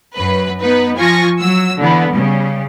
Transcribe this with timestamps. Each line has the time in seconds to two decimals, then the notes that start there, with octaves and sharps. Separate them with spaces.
0.16 F#2 B4
0.61 B3 D#4 B4
0.97 F3 F4 G#5 C#6 A#6
1.41 F#3 E6
1.80 D3 E3 B3
2.11 C#3 G3